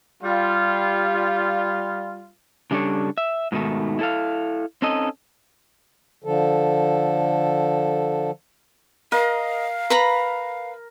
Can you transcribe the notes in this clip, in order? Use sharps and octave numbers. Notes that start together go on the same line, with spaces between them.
G3 F4
C#3 G3 D4 A4 C#5
E5
G#2 B2 D#3 A3
E4 A4 F5
C4 C#4 D#4 A4 D#5
D3 F3 A4
A#4 D#5 F5
B4 A#5 B5